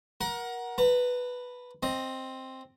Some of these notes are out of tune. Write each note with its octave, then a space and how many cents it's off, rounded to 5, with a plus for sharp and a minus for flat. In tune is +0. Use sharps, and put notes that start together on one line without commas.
A#4 +25 F#5 +0
B4 +0 A#5 -40
C4 +5 D#5 +0